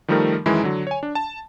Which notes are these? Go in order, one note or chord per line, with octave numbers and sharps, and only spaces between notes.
D#3 F3 G3 A3 D#4 A#4
F#2 D#3 E3 G#3 E4
D3 F#3
C#5 G#5
D4
A5